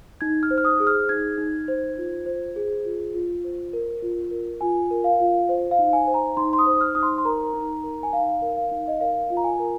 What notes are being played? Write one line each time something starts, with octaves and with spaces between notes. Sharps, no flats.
D#4 G#6
F6
C5
F6
D#6
G#4
F6
D#4 G#6
D#4
C5
F4
C5
G#4
F4
F4
C5
A#4
F4
A#4
F4 G#5
A#4
F5
F4
C5
F5
D#4
G#5
C5
A#5
D#4 C6
C6
D#6
C5
F6
D#4 D#6
C6
C6
A#4 A#5
D#4
A#4
G#5
D#4 F5
A#4
F5
D#4
D#5
A#4 F5
F4
A#5
G#5
A#4